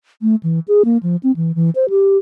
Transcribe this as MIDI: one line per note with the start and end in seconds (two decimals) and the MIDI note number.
0.22 0.35 57
0.43 0.60 52
0.68 0.82 68
0.85 0.98 58
1.03 1.16 53
1.23 1.32 60
1.36 1.55 52
1.55 1.70 52
1.75 1.89 72
1.90 2.17 67